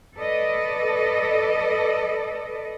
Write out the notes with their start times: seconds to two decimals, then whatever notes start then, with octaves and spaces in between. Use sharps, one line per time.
0.18 A4 B4 D5 D#5